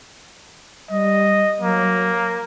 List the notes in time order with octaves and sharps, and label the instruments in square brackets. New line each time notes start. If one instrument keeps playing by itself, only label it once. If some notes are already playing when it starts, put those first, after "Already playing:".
[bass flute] G3 [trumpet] D#5
[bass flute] F#3 [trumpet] A#3